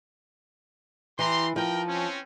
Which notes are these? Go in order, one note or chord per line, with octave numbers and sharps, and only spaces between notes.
E3 G4 A#5 C6
F3 A#4 G5
C4 C#4